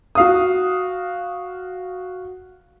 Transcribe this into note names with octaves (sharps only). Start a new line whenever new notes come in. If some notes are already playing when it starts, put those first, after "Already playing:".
F#4 F5 D#6